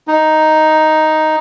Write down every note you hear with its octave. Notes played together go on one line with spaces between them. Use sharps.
D#4